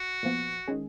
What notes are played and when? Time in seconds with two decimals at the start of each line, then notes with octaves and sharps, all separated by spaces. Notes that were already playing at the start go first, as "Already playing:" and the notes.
Already playing: F#4
0.23 A#2 F3 B3
0.68 D#3 G#3 C#4 G#4